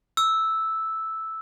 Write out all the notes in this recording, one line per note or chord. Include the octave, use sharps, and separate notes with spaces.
E6